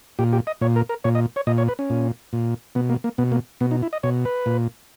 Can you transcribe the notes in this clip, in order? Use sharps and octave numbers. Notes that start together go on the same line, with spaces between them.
A#2 G4
G4
D#5
A#2 C#5
A#4
A#4
A#2 C#5
D#5
C#5
A#2 D#5
C#5
B4
C#4
A#2
A#2
B2 B3
A#3
A#3
B2 B3
A#3
B2 B3
D#4
E4
D#5
B2 C#5
B4
A#2